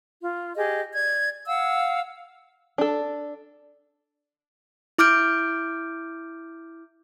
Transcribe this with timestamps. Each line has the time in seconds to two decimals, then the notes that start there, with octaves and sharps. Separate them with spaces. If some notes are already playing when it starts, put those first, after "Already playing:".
0.23 F4
0.55 G4 G#4 D#5
0.94 D5 G#6
1.46 F5 F#5 E6
2.78 D4 A4
4.98 E4 D6 F6 G6 D7